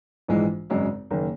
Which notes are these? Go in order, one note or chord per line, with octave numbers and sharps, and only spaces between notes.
A#1 G#2 E3 G#3
G#1 F#2 C#3 G#3
F#1 D#3 A#3